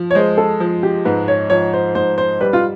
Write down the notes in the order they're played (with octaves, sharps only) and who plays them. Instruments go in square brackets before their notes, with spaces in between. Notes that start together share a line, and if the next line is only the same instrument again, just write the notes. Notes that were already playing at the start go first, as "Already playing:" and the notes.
Already playing: [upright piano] F3
[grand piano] C#5
[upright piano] G#3 [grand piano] C5
[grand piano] A4
[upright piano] F3
[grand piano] G4
[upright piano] G#2 [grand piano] B4
[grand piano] C#5
[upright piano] F3 [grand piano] C#5
[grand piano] C5
[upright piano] G#2 [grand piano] C5
[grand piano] C5
[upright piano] G3 [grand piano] B4
[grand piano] F4